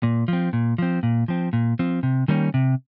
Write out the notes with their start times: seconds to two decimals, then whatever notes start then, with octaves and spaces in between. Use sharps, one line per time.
0.03 A#2
0.28 F3 C4
0.53 A#2
0.78 F3 C4
1.03 A#2
1.28 F3 C4
1.53 A#2
1.79 F3 C4
2.03 C3
2.28 D#3 G3 A#3 C#4
2.54 C3